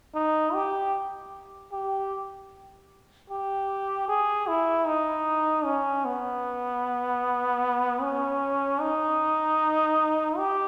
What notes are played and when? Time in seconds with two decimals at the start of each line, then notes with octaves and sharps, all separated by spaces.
0.15 D#4
0.54 G4
1.72 G4
3.30 G4
4.08 G#4
4.47 E4
4.87 D#4
5.65 C#4
6.05 B3
8.02 C#4
8.81 D#4
10.38 G4